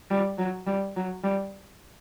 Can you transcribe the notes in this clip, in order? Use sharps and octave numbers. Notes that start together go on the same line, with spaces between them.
G3
F#3
G3
F#3
G3